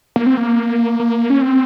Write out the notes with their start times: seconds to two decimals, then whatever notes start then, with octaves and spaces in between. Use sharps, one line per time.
0.16 A#3
0.26 C4
0.37 A#3
1.00 A#3
1.30 C#4
1.41 C4